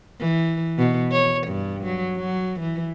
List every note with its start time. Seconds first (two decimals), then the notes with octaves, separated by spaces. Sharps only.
0.20 E3
0.78 B2
1.12 C#5
1.47 G2
1.84 F#3
2.16 F#3
2.60 E3